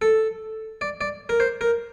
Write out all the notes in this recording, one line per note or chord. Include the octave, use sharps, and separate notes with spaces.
A4
D5
D5
A#4
C5
A#4